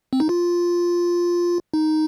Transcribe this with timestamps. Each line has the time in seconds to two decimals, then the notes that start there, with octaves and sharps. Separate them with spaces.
0.13 C4
0.20 D#4
0.29 F4
1.74 D#4